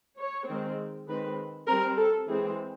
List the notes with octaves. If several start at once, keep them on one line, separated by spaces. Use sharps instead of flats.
C#5
D#3 G#3 C4
D#3 G#3 C4 B4
G3 C4 A#4
A4
E3 G#3 C4 G#4